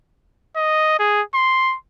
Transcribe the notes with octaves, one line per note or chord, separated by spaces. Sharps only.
D#5
G#4
C6